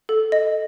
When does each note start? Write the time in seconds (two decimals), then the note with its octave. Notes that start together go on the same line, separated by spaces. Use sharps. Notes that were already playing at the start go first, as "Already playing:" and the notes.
0.09 A4
0.32 D#5